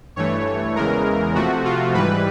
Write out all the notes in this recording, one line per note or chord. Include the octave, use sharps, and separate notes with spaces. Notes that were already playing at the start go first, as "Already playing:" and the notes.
G2 E3 A3 C#5
E2 C#3 E3 G#3 A#4
C3 F3 A3 F#4
F4
G#2 E3 G3 B4